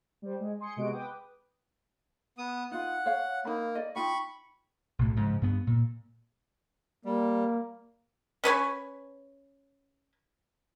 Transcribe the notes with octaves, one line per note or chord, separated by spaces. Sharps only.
G3 C5
G#3
G#5 C6 D#6 C#7
C3 G#3 B3 F#4 D#5 D7
B4 G5 D6 D#6
B3 D#6
D#4 F4 F#5
C#5 F5
A#3 D#4 B5
D5 D#5
D#4 F4 G5 B5 C#6
B1 A2
G#2 C#3 F3
G2 B3
A#2
G3 A#3
C#4 B4 C#5 G#5